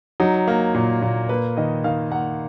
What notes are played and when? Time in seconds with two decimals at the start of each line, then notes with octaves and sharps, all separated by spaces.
0.20 F#3 D#4
0.48 A#3
0.74 A#2
1.02 A#2
1.29 A#3 B4
1.57 D#3 D#5
1.84 D#3 F5
2.11 A#3 F#5